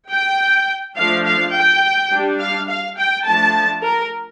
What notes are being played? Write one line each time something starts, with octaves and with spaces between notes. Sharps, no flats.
G5
F3 A3 D4 F5
F5
G5
G3 D4
F5
F5
G5
F3 A3 D4 A5
A#4